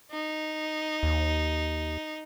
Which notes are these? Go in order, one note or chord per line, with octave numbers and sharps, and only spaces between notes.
D#4
D#2